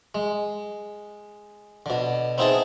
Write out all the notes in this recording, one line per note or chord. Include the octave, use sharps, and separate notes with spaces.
G#3
B2 D3
B3 C4 D#4 E4 G#4 A5